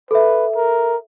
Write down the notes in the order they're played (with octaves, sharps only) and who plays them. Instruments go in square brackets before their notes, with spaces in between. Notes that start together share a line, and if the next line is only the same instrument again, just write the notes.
[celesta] A4 E5 [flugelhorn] B4
[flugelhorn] A#4